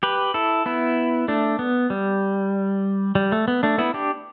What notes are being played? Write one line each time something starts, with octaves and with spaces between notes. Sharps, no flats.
G4 B4
E4 A4
B3 E4
A3 D4
B3
G3
G3
A3
B3
A3 D4
B3 E4
D4 G4